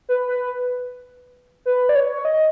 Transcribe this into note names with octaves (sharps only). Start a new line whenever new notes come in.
B4
B4
B4
D5
C#5
D#5